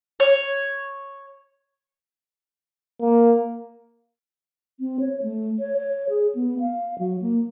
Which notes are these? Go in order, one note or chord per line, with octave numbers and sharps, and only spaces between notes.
C#5
A#3
C4
C#5
A3
C#5
C#5
G#4
B3
F5
F#3
A#3